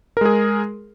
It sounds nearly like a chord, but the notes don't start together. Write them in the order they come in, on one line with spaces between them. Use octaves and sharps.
A#4 G#3 G#4